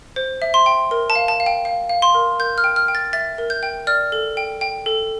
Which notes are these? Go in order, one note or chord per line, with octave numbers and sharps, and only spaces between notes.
C5
E5
C6
G5
A#4
A5
F5
A5
F5
G5
F5
F5
C6
A#4
A#4 G6
F6
G5
F6
G5
A6
E5 A6
A#4
G6
G5
D5 F6
A4
G5
G5
A4